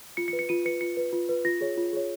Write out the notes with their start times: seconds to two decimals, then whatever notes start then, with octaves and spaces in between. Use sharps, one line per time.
0.17 F4 C#7
0.28 C#7
0.33 B4
0.39 C#7
0.49 F4 D#7
0.65 B4 C#7
0.81 F4 C#7
0.97 B4
1.13 F4
1.29 B4
1.45 F4 A#6
1.61 G#4 C#5
1.77 F4
1.93 G#4 C#5